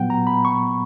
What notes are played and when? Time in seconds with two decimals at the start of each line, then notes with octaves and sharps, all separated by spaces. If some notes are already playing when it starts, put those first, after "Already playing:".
Already playing: A#2 F#3 B3 F#5 G5
0.10 A#5
0.27 B5
0.45 C#6